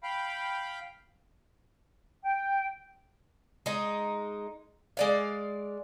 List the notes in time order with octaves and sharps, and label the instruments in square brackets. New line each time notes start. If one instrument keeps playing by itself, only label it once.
[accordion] F5 G5 B5
[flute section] G5
[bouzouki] G#3 D#4
G#3 D5 F5